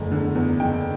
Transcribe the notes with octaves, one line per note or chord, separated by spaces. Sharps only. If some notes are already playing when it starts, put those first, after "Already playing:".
Already playing: F#1 E2 D3 A3
D3
E2
F#1 G5